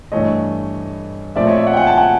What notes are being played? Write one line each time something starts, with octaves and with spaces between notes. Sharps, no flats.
G2 E3 A3 C#5 D#5
A#2 F3 A3 C4 D5 E5
C#5 D#5
D5 E5
E5 F#5
G5
F#5 G#5
G5 A5
F#5 G#5